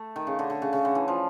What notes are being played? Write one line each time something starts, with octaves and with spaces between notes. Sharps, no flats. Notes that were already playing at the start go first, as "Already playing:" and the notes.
Already playing: A3
D#3
C#3
D3
D3
C#3
C#3
D3
E3
F3